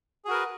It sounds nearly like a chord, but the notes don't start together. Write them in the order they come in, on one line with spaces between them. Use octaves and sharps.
G#4 F#4 A#4 B4